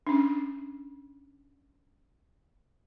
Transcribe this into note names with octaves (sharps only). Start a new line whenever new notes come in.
C#4 D4